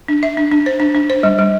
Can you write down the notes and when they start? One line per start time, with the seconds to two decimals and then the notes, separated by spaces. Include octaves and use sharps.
0.08 D4
0.23 E5
0.37 D4
0.52 D4
0.66 C5
0.80 D4
0.95 D4
1.10 C5
1.23 G3
1.38 G3